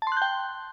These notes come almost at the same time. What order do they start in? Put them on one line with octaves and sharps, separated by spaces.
A5 C6 F#6 G6 G5